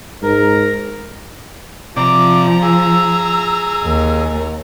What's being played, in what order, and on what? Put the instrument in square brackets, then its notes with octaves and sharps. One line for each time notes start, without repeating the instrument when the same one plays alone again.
[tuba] G#2 [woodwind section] A#4 A#5
[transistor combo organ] C3 D5 [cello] F3 [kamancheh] A#5 [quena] D6
[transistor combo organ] G#4 [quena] E6
[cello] D#2